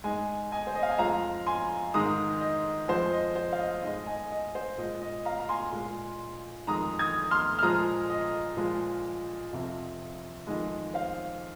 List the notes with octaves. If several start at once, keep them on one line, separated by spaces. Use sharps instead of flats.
G#2 G#3 D#5 G#5
D#5 G#5
C5
D#5
F5
G#5
F2 F3 G#3 F5 A#5
G#5 C6
G#2 D#3 G#3 A#5 D#6
D#5
F2 F3 G#3 C5
D#5
C5
F5
D#5
G#2 G#3 D#5
D#5 G#5
D#5
C5
A#2 G#3 D#5
D#5
F5 A#5
A#5
G#5 C6
A#2 G#3
F2 D#3 G#3 A#5 D#6
D#6 G#6
C6 F6
F6
A#2 F3 G#3 A#5 D#6
D#5
A#2 F3 G#3
F2 C3 F3
F2 D#3 G#3 D#5
C5 F5